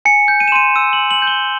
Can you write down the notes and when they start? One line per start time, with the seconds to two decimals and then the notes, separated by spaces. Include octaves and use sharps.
0.05 G#5 C#7
0.28 G6
0.40 D#7
0.48 E7
0.52 C6 D#7
0.75 E6 D#7
0.93 F#7
0.99 G#5
1.11 F#7
1.22 G6
1.27 G7